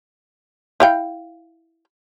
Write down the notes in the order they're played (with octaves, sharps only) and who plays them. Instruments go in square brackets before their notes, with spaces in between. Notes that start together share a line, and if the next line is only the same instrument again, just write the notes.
[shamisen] E4 F5 G5